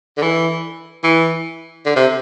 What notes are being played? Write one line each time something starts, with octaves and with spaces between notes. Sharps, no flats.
D3
E3
E3
D3
C3